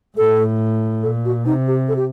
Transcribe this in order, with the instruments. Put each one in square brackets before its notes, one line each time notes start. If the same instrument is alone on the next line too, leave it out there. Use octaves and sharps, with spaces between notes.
[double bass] A2 [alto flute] A4
[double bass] A#2 [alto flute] A4
[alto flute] F#4
[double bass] C3 [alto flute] D#4
[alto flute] G4
A4
G4